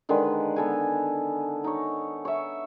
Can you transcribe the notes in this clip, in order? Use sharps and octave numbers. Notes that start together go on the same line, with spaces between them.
D3 D#3 G#3 B4
B3 A4 G#5
D#4 C#5
C#5 E5